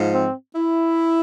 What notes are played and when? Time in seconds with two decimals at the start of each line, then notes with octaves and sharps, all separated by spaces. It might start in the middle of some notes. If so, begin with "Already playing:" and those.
Already playing: G#2 F3
0.13 C4
0.56 E4